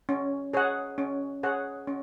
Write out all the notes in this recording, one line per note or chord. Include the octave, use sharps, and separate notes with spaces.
C#4
G#4 C#5 F#5
C#4
G#4 C#5 F#5
C#4